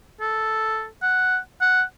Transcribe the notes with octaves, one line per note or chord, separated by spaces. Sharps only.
A4
F#5
F#5